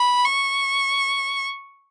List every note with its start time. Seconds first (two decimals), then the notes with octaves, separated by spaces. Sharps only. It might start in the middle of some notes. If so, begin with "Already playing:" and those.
Already playing: B5
0.25 C#6